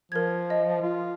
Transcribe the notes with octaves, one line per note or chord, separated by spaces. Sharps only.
F3 A#4 G#6
D#5
F4